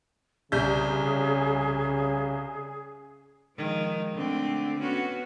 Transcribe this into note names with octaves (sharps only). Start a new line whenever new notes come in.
C2 C#3 G#4 G6
D#3 F3 G#3
D3 A3 C4
B3 C#4 F#4